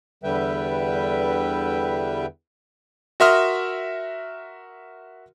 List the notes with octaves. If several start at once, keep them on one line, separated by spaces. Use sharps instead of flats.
E2 D3 G3 B4 E5 G5
F#4 A#4 E5 C6 D#6 F6